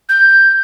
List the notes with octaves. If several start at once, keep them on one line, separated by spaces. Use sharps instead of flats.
G6